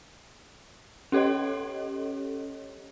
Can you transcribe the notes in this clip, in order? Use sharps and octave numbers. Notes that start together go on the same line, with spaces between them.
C#4 G4 A4 C#5 D#5